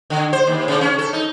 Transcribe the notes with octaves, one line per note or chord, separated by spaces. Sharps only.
D3
C5
D#2
C#3
C#4
A4
D#4